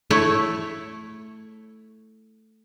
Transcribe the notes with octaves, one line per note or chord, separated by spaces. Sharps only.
A3 E4 C#5